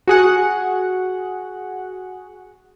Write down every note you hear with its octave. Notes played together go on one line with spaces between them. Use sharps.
F#4 G#4 F#5